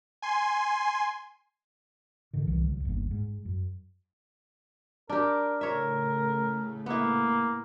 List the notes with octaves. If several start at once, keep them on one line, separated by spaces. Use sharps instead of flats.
G#5 C6
G#2 D3 D#3
C2 D#3 E3
C#2 F#3
G1 D#2
G#2
F#2
D4 G4 A#4
A2 C#3 A3 A#4 C#5 E5
A#3 B3 E4